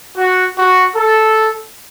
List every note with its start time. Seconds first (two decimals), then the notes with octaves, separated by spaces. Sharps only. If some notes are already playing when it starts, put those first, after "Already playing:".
0.17 F#4
0.57 F#4
0.95 A4